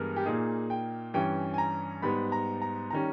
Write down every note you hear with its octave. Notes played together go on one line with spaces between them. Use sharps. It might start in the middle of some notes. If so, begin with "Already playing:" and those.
Already playing: G2 E3 G#3 B3 A#4
G4
A#2 A#3 D#4 G#4
G5
G2 E3 G3 C#4 G5
G#5
A#5
G#2 G3 B3 B5
A#5
A#5
D#3 G3 C#4 A#5